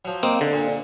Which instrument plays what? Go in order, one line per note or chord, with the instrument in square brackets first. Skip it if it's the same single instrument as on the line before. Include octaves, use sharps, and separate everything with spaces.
[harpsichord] F3 F#3
[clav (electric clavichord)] A#3 C4 [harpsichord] D#4
[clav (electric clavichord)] D3
[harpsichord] A#2